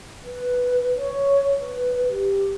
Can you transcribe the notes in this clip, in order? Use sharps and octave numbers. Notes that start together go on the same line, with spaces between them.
B4
C#5
B4
G4